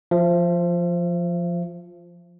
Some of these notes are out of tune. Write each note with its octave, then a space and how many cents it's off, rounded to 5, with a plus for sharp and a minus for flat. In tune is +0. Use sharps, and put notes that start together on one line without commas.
F3 +0 E5 +45